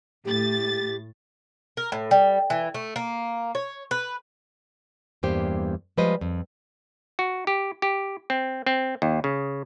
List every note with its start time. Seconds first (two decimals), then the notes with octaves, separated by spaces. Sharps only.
0.25 A2 G4 A6
1.77 A#4
1.92 A2
2.11 G3
2.50 E3
2.74 A3
2.96 A#3
3.55 C#5
3.91 B4
5.23 E2 G2 A#3 G4 C5
5.97 F3 G3 G#3 B4 C5 D#5
6.21 F2
7.19 F#4
7.47 G4
7.82 G4
8.30 C4
8.67 C4
9.02 D#2
9.24 C#3